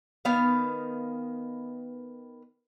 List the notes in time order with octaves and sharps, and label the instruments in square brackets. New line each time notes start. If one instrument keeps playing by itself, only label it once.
[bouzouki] D#3 B3 F5